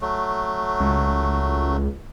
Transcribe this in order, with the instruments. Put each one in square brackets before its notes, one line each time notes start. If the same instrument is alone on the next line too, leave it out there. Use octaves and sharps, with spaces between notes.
[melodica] F#3 A3
[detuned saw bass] C#2